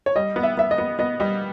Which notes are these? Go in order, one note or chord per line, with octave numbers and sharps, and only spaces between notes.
C#5
G3 D#5
B3
E5
B3 E5
D#5
B3
B3 D#5
G3 D#5